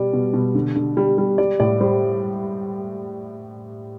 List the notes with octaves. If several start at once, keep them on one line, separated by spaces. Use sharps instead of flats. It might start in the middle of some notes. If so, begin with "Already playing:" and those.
Already playing: B2 G3 D5
B2
B2
D3
D3
G3
G3
G3 D5
A2 D5
G3 C5